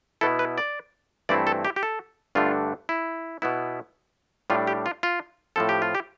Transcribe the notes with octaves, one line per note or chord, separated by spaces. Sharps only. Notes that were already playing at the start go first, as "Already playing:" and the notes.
B2 B3 E4 A4
B4
D5
G2 E3 A3 C4 E4 D5
A4
G4
G4
A4
G2 D3 A3 D4 F4
E4
B2 B3 E4
A2 G3 D4 F4
G4
F4
F4
A2 F3 C4 A4
G4
F4
G4